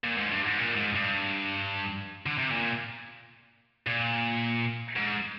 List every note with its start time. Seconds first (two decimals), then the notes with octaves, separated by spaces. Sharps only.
0.04 A#2
0.17 G#2
0.31 G2
0.46 G#2
0.58 A#2
0.76 G#2
0.95 G2
2.26 D3
2.38 C3
2.50 A#2
3.87 A#2
4.96 G#2